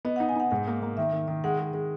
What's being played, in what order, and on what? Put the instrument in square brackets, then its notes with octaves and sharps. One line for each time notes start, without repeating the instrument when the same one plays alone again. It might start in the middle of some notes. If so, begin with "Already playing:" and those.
[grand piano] B3 [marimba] D#5
[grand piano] D#4 [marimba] F#5
[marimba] G#5
[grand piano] D#4 [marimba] F#5
[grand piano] G#2 [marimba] F#5
[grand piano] A#3
A#3
[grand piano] D#3 [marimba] E5
[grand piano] D#3
D#3
[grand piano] G#3 [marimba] F#5
[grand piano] G#3
G#3